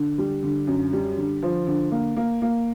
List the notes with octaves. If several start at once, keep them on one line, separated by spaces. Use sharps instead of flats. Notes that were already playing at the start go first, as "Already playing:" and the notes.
Already playing: D3
G3
D3
F#2
G3
D3
F3
D3
A#3
A#3
A#3